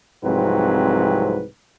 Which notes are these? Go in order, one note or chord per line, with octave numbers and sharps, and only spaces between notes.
C2 G#2 F3 F#3 C4 B4